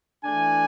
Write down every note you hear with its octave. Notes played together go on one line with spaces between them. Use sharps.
E3 A3 D4 G#5